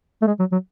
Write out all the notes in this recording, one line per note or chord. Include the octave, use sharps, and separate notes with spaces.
A3
G#3
F#3
F#3